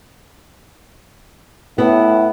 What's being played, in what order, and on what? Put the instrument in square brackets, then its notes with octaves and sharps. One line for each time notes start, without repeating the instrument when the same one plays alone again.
[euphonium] A2 [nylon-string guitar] B3 E4